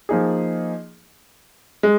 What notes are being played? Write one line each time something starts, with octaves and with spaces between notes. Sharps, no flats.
F3 A#3 D#4 G#4
G#3